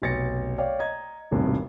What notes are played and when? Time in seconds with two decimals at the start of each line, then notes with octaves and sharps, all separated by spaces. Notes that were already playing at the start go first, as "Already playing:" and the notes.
0.02 F1 B1 A6 A#6 C#7
0.58 C#5 D5 F5 G5
0.79 D#5 A#5 G#6
1.31 E1 A1 G2 C3 D#3